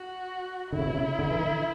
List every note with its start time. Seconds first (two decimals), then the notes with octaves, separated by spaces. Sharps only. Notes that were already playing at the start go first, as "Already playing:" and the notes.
Already playing: F#4
0.72 D3 E4
0.79 C#3
0.86 B2
0.94 C#3
1.19 D3
1.31 E3
1.43 D3